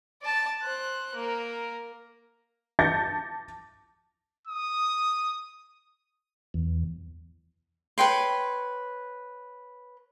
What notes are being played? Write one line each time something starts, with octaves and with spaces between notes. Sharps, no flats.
D5 A5
C5 F#6
A#3 A#4
A5 D6 G6 A6 A#6 C#7
D#6
E2
B4 C#5 G5 C6